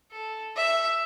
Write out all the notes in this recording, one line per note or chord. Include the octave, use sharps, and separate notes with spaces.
A4
E5